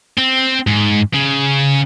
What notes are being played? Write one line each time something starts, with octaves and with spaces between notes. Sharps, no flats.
C4
G#2
C#3